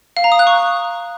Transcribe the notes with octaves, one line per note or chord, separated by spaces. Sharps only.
F5
A#5
D#6
F#6
C#6